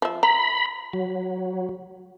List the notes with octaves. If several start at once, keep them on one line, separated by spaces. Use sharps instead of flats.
F3 E5
A#5 B5
F#3